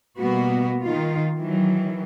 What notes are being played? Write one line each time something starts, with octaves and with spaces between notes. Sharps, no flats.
B2 G3 A#3 B3 F#4
D#3 F4
D#3 E3 F#3